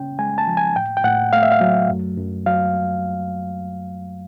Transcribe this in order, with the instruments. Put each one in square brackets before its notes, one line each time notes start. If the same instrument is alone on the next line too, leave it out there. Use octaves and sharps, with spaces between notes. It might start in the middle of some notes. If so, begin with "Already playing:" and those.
Already playing: [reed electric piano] C#3 C#4 G5
G#3 G#5
A5
F3
G#5
A2 G5
G5
A2 F#5
A3 F5
E5
F5
F#3
F#2
F#2
F#3 F5